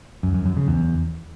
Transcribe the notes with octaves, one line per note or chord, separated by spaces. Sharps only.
F#2
F#2
F#2
C#3
E2